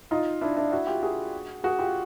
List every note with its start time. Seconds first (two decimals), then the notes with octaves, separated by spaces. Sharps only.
0.11 D#4 F4
0.41 D4 E4
0.57 D4 E4
0.72 E4 F#4
0.87 F4 G4
1.02 F#4 G#4
1.64 F#4 G#4
1.79 F4 G4